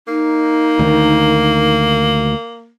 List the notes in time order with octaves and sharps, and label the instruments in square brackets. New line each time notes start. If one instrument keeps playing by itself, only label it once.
[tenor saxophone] A#3 [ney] D#4
[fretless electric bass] D2 D#3